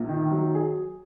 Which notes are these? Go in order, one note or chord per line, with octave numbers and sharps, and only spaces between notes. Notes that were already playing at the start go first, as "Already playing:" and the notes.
Already playing: A#1 A#3
D#3
F#3
G#4